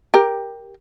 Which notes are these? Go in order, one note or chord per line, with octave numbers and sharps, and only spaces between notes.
G4 A#4